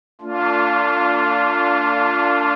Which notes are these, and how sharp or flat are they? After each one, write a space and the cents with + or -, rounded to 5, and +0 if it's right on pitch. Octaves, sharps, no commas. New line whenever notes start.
A3 +35 D4 -20 F4 +0